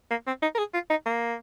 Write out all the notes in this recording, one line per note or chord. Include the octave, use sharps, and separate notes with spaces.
A#3
C4
D#4
A#4
G#4
F4
D#4
A#3